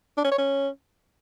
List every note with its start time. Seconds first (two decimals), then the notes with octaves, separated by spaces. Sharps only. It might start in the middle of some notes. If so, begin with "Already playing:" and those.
0.17 D4
0.24 C#4
0.31 C#5
0.38 C#4